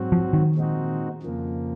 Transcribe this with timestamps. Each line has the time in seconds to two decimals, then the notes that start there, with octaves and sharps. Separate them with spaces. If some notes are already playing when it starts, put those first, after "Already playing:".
Already playing: G#2 F#3 C4 F#4
0.12 F3
0.33 D#3
0.55 A#2 G#3 C4 D#4 F#4
1.23 F2 C#3 F3 A#3